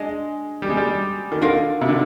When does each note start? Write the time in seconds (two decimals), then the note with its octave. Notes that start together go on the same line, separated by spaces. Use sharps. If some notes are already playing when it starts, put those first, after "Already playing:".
Already playing: G#3 D4 D#5
0.62 G3
0.70 G#3
0.77 G3
1.32 D#3
1.41 D3 F4 A#4 F5
1.81 C3
1.89 D3